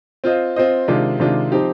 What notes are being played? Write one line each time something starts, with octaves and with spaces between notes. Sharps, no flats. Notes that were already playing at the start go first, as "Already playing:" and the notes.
C4 F4 C5 D#5
C4 F4 C5 D#5
C3 D#3 G#3 D4 F4
C3 D#3 G#3 D4 F4
F3 C4 D#4 G4